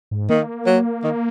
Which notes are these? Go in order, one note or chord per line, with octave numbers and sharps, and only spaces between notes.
G#2
D#3 A#3
F#3
D#3